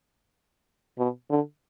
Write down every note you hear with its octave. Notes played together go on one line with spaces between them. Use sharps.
B2
D3